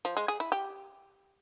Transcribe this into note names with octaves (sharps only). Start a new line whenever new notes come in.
F3
G#3
G#4
E4
G4